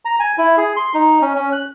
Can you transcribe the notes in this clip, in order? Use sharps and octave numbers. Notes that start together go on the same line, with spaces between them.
A#5
G#5
E4
G#4
C6
D#4
C#4
C#4
F#6